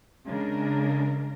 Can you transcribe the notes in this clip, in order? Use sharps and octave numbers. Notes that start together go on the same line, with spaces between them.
C#3 G#3 D4 A#4